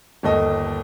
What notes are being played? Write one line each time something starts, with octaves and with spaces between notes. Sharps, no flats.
G1 D#2 A4 D#5